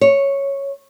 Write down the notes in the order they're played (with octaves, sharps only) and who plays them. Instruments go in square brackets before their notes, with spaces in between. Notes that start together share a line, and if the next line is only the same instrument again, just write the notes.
[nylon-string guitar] C#5